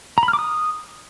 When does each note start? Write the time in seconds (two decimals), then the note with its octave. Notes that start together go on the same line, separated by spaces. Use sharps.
0.18 A#5
0.23 B5
0.28 F6
0.33 D6
0.39 D#6